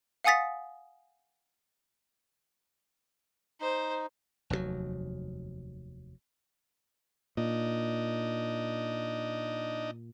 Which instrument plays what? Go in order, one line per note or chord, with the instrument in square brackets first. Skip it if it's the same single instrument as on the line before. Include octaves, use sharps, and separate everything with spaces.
[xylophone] F5 F#5 G#5 D#6 A6 B6
[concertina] D#4 [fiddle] C5
[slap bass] F1 D#2 G#2 F#3
[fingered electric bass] A#2 [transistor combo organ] D4 D#4 D#5